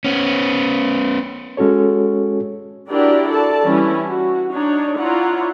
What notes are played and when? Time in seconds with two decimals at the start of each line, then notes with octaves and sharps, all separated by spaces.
0.04 B3 C#4
1.57 G#3 C#4 F#4 A4 C#5
2.89 D4 E4 F#4 G4 A#4 D5
3.30 A4 D5 A5
3.63 E3 G3 C#4 E4
4.08 F#4
4.53 D4 D#4 C#5
4.98 E4 F4 C#5 D5 F#5 A#5